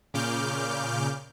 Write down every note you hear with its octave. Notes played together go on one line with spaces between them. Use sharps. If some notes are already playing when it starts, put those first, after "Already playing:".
A#2 C#3 D6 F6 G6